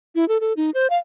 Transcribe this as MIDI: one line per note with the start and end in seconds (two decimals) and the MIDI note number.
0.15 0.27 64
0.28 0.40 69
0.40 0.53 69
0.57 0.70 63
0.74 0.87 72
0.90 0.98 77